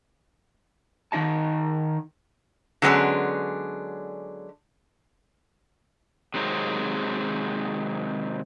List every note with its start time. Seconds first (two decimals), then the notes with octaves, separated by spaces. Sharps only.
1.12 D#3 B3 D#4 D#5 A5
2.82 D3 F#3 G#3 B3 C#4 D4
6.34 C3 D#3 F#3 G#3 C4